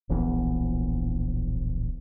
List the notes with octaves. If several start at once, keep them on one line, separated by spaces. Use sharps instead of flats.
D1 A#1 E3 B3